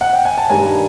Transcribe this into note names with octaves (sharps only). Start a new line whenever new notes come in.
F#5
G5
G#5
A5
G2 D#3 G3 G#5 A#5